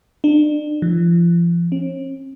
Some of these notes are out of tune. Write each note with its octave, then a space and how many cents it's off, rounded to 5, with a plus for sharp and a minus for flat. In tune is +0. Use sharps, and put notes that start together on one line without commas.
D4 +30
F3 -35
C#4 -45